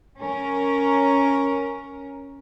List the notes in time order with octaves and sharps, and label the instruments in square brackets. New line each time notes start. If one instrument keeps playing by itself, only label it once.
[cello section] C#4 A#4